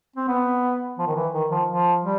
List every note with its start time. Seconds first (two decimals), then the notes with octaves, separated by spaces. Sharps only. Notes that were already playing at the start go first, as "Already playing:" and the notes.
0.16 C4
0.28 B3
0.99 F3
1.07 D#3
1.16 E3
1.33 D#3
1.51 F3
1.68 F3
2.03 G3